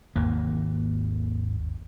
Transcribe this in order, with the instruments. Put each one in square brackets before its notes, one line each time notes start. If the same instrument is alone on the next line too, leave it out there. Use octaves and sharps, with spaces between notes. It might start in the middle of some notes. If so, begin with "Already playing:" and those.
[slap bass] G#1 D#2 A#3